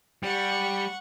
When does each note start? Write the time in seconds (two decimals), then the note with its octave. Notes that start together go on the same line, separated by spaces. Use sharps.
0.23 G3 F#5 C#6